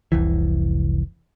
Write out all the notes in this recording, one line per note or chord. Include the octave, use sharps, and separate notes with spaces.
F1 C2 E3